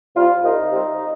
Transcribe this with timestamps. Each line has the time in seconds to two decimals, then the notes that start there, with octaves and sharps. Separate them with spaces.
0.16 C3 G3 C4 F4
0.43 C2 D#4
0.71 C3 G3 C4